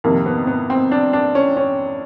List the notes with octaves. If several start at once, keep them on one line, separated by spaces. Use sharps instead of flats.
F2 C3 D#3 A#3
B3
B3
C4
D4
D4
C#4
C#4